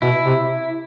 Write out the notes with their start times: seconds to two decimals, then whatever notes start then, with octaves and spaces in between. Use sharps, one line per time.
0.02 B2 E4
0.26 C3